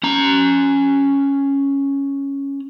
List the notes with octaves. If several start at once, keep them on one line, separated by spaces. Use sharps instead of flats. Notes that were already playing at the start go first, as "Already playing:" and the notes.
C#4 A#5